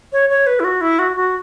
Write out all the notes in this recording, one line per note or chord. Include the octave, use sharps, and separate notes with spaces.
C#5
C#5
B4
E4
F#4
E4
F#4
F#4